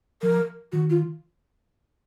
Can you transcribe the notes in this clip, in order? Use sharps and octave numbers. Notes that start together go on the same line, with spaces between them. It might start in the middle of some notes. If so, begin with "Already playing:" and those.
F3 A#4
D#3 F#4
F4